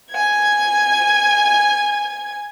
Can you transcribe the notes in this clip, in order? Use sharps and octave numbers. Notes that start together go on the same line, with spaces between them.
G#5 G#6